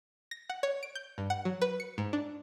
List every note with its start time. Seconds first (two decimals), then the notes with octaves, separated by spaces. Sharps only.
0.31 A#6
0.50 F#5
0.63 C#5
0.83 D7
0.95 G6
1.18 G2
1.30 F#5
1.45 F#3
1.62 B4
1.80 C#7
1.98 G#2
2.13 D4